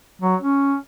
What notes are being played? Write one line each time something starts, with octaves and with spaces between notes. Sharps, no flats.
F#3
C#4